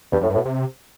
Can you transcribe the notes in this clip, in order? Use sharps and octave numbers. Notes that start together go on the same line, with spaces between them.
E2 G2
F#2 A2
G2
A2
B2
C3